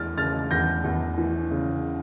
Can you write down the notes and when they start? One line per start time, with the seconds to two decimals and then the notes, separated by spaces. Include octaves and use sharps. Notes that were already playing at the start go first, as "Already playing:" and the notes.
Already playing: E2 E3 F6 A6
0.18 C#3 F6 A6
0.51 E2 G6 A#6
0.84 E2
1.17 E3
1.51 C#3